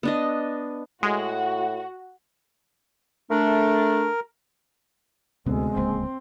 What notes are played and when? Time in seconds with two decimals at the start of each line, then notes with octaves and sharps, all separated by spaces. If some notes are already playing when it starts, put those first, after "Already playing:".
0.03 B3 D4 D#5
1.03 A2 G#3 F#4
3.30 A3 D4 A#4
5.46 D2 C3 G#3 B3 C4
5.76 D1 C#2 A#3 C4